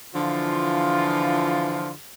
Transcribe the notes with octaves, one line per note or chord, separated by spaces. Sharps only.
D3 E3 F3 F4